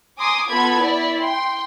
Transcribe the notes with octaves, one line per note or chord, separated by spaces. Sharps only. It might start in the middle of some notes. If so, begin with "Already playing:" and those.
G#5 A#5 C6 D6 D#6
B3 F4 A4 A5 B5 G#6
E4 D5
G5 C6